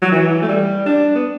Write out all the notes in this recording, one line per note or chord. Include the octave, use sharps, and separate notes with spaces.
F#3
E3
A3
G3
D4
B3